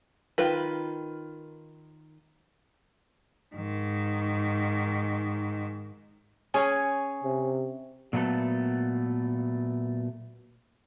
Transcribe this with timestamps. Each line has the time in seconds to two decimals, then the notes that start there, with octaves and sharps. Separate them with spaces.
0.38 D#3 F4 B4 B5
3.55 G#2 D#3
6.54 C#4 G#4 C#5 G#5
7.23 C3
8.13 A#2 F#3 A3 B3 A4